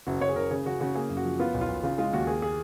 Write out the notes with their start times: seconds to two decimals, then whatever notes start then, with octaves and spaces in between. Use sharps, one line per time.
0.07 F#1 F#4
0.21 F#1 C#5
0.29 G#4
0.36 F#1 A#4
0.51 C#3 G#4
0.66 C#3 F#4
0.80 C#3 F#4
0.95 A#3 G#4
1.10 F#2
1.17 F#4
1.25 F3
1.39 B3 F4
1.54 B1
1.61 F4
1.68 B1
1.83 C#3 F4
1.98 G#3 F4
2.13 D#2 F#4
2.27 A#3 G#4
2.42 G#4